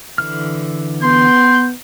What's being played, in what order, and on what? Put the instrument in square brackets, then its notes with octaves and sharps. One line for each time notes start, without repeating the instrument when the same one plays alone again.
[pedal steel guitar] D3 E3 F6
[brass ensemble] B3 [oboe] C6 [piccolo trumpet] G6